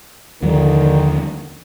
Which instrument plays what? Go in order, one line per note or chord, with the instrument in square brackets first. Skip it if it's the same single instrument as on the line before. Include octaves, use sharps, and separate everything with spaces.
[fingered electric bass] D#2 F3 G3 [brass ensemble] D3 D#3 A#4